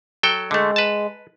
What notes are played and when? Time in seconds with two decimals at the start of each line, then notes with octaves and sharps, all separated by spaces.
0.23 F#3 A4 G5
0.51 D3 G#3 A3
0.76 B4 A5